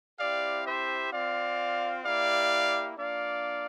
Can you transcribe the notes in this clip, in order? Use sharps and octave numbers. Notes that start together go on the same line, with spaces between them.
C4 E4 G4 D5 F5
C5 E5
C4 F4 D5 F5
A#3 E4 G4 D5 F5
A#3 D4 F4 D5 F5